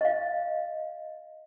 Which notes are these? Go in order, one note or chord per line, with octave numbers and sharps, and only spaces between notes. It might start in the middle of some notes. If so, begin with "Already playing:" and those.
D#5 F5